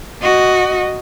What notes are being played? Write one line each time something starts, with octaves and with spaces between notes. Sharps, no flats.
F#4 D#5